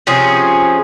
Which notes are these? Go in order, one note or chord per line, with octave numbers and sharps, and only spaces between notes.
C3 F3 C#4 G#4